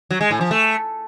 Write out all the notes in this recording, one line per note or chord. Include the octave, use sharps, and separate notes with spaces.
F#3
G#3
A2
F3
A3